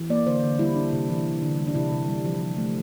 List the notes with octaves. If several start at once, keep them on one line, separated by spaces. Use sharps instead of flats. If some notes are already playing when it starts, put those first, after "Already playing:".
Already playing: E3
A#3 D5
D3 C5
D3
G3 E4
D4
C3
E3
D3
D3
G3
D4
C3 E4
C3
G3
F3
F3
A3